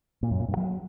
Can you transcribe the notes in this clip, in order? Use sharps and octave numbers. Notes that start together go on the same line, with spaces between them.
A#2
F#2
A#2
G2
F#3